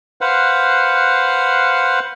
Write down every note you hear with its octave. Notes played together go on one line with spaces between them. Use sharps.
B4 C5 F5 F#5